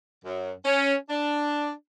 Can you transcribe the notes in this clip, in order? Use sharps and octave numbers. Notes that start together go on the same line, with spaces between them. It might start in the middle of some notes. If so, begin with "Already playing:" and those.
F#2
C#4
D4